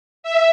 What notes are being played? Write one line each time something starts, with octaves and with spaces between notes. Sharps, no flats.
E5